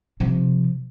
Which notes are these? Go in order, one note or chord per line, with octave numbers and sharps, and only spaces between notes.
C3 F3